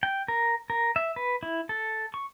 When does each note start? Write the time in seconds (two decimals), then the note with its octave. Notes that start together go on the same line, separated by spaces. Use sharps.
0.03 G5
0.28 A#4
0.70 A#4
0.96 E5
1.16 B4
1.43 E4
1.69 A4
2.14 C#6